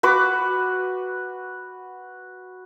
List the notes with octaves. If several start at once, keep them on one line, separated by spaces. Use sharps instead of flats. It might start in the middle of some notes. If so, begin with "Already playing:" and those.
F#4 B4 D6